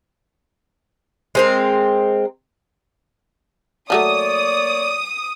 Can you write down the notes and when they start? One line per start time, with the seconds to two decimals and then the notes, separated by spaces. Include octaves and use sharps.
1.35 G#3 C4 A#4
3.90 F3 F#3 A3 A#3 C#5 D5 D#6